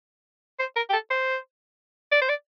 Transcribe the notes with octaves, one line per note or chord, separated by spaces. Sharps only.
C5
A#4
G4
A4
C5
D5
C5
D5